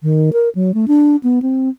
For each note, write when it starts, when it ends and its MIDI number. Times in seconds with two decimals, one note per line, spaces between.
0.03 0.30 51
0.33 0.49 70
0.55 0.74 54
0.74 0.85 57
0.88 1.16 62
1.23 1.39 59
1.42 1.69 60